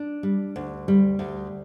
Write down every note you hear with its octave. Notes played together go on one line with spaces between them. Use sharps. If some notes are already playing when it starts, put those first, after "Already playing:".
Already playing: D4
G3
D2
G3
D2